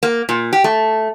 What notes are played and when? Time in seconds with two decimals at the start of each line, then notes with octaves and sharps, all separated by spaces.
0.03 A#3
0.29 A#2
0.53 G4
0.64 A3